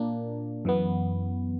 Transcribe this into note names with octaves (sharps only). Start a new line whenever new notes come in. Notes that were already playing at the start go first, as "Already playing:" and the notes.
Already playing: A#2 A#3 D4
F#2 E3 B3